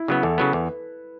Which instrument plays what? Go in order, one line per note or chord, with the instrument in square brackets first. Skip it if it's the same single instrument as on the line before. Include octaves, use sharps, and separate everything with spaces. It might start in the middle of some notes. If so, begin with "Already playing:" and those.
Already playing: [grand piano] E4
[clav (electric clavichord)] C#3 F#3 B3
[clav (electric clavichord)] E2 [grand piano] A4
[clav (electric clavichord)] C#3 F#3 B3
[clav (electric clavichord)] E2 [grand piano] B4